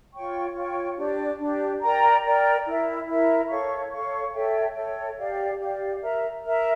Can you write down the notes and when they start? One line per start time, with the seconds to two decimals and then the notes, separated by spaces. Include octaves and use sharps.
0.13 F4 C#5 G5 C#6
0.55 F4 C#5 G5 C#6
0.97 D4 G4 D5
1.39 D4 G4 D5
1.82 A#4 D5 G5 A#5
2.23 A#4 D5 G5 A#5
2.66 E4 A#4 E5
3.07 E4 A#4 E5
3.49 A4 C#5 F5 C#6
3.91 A4 C#5 F5 C#6
4.34 A4 C#5 E5 G5
4.75 A4 C#5 E5 G5
5.18 G4 D5 F5
5.59 G4 D5 F5
6.01 A#4 E5 A#5
6.44 A#4 E5 A#5